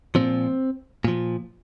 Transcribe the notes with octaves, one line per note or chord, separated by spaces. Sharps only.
A#2 F3 C4
A#2 F3